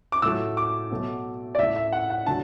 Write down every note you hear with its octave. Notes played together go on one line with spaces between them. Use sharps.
D6
A2 F#3 A3 E6
D6
B2 F#3 A3
D5
A2 A3 E5
E5
F#5
F#5
D3 F#3 A3 A5